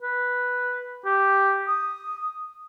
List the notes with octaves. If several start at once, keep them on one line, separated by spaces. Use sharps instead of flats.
B4
G4
D#6